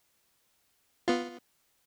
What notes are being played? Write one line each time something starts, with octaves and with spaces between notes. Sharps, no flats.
B3 F4